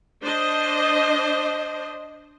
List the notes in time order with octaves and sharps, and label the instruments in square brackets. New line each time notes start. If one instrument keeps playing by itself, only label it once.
[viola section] D4 C5 D#5